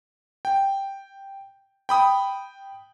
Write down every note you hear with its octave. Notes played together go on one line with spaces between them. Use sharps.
G5
G5 B5 D#6